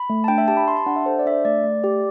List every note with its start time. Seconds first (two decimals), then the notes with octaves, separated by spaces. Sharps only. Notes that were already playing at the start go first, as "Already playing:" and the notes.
Already playing: B5
0.10 A3
0.24 A5
0.28 D4 G5
0.38 E5
0.48 G4 A5
0.57 B5
0.67 G4 C6
0.77 A5
0.86 D4 F#5
0.96 E5
1.06 A4 C5
1.19 D5
1.25 D4 E5
1.31 D5
1.45 A3 D5
1.64 A3
1.84 G4